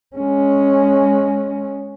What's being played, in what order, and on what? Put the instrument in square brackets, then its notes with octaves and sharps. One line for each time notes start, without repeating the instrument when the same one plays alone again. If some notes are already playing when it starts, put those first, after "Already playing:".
[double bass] G#3 C#4